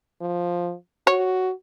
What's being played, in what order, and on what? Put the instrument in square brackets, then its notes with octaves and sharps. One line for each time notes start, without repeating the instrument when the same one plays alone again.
[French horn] F3
[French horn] F#4 [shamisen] C#5